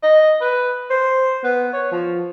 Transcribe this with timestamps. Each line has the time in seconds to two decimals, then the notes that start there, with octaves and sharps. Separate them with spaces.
0.03 D#5
0.41 B4
0.90 C5
1.44 B3
1.73 C#5
1.92 F3